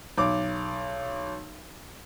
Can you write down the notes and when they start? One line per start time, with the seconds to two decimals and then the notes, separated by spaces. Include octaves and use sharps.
0.18 B1 D6